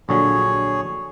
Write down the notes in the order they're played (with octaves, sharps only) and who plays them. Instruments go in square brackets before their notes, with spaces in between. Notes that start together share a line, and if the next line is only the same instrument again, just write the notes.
[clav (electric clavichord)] A#1 D3 F#3 [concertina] G#4 C#5